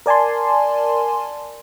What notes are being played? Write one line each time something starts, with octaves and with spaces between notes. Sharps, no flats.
A#4 D5 G#5 A5 C6